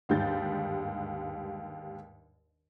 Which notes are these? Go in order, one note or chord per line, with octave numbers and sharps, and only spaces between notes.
G1 D#2 G#2 G3 G6 A6